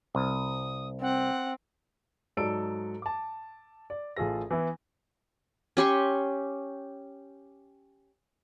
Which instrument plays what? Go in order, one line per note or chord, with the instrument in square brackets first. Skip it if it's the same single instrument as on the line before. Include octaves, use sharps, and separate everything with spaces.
[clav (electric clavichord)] C2 [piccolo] D#6
[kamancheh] C4 [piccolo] F#5
[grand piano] G#2 F#3 A4 D5 D7
A5 D6
D5
A1 F4 G#4 A4 A#6
E3 B3 E4
[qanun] C#4 G4 C6 C#6